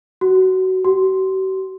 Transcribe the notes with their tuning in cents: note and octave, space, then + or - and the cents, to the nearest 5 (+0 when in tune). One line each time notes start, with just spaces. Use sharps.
F#4 +20
F#4 +45